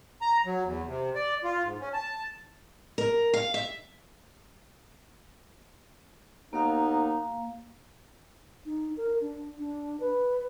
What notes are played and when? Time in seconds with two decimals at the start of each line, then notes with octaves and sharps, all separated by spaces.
0.21 A#5
0.46 F#3
0.64 E2
0.87 C3
1.15 D5
1.44 F4
1.63 G#2
1.81 C#4
1.93 A5
2.98 A#4
3.34 F5
3.54 E5
6.53 D#2 A#3 B3 D#4 F5
8.66 D#4
8.97 A#4
9.21 D4
9.58 D4
10.00 B4